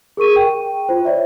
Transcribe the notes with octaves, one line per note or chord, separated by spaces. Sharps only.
G#4 A#4 C#6 D#7
G5
F4 C5
C#5 D5 E5